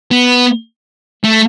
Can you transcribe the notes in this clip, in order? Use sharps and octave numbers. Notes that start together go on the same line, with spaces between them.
B3
A3